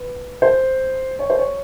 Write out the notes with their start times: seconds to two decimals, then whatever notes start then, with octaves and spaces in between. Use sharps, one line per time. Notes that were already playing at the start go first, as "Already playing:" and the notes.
Already playing: B4
0.42 C5
1.19 C#5
1.30 C5
1.39 C#5